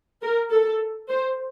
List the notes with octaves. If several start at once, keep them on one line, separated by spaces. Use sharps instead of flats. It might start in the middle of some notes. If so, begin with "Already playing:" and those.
A#4
A4
C5